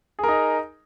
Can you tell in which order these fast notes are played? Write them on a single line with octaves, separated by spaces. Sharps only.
G#4 A#4 D#4